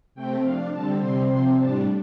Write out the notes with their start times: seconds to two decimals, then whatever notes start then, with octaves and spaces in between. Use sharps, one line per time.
0.15 C3 A3 C4 G5
0.43 F3 D4 F5
0.72 D3 G3 C4 A5
1.00 C3 G3 C4 C6
1.29 C3 F3 C4 C6
1.58 A2 G3 D4 A5